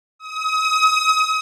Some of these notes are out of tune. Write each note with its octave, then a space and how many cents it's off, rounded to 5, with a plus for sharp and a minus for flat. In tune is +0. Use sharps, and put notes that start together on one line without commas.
D#6 +35